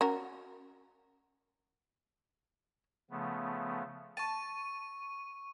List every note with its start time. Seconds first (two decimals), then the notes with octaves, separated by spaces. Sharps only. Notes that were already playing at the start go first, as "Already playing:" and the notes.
0.01 C#4 F#4 A#4
3.11 C#3 F3 A3 B3
4.17 A5 C#6 D#7